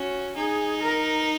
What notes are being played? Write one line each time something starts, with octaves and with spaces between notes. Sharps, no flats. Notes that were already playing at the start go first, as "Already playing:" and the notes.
Already playing: C#4 F#4
D#4 G#4
A#4